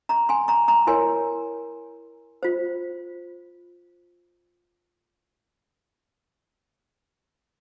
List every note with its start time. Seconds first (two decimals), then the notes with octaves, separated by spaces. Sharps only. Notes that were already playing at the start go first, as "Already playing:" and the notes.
0.09 A#5 C#6
0.29 G#5 C6
0.48 A#5 C#6
0.68 A#5 C#6
0.87 E4 A#4 C#5 G#5 C6
2.43 F4 C5